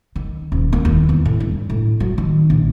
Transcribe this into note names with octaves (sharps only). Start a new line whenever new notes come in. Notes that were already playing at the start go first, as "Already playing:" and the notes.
D#3
D#1
A#3
D#2
E2
A2
G2
A2
F#3
D#3
A#1